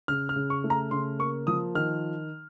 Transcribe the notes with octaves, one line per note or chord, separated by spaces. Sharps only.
C#3 F6
F6
C#3
C#6
A3
A#5
C#3 C6
A#3 C#6
F3 D#6
D#3 F6